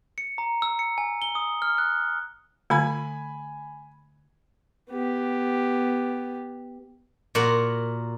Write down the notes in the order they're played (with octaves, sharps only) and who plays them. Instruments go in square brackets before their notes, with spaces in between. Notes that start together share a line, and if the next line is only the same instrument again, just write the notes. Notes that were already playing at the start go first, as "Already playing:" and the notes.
[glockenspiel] C#7
A#5
E6
C#7
G#5
G7
D#6
F6
F#6
[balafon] D3 A3 [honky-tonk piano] G#5 B5 G#6
[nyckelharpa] B3 G4
[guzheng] A#2 F#4 A#4 F#5